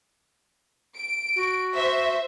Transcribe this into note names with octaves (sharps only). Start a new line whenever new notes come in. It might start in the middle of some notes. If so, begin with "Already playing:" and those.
D7
F#4
C5 E5